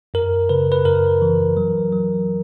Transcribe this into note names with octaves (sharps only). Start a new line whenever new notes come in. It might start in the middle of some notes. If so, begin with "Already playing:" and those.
F#2 A#4
C#3 B4
B4
F#2 A#4
E3
F#3
F#3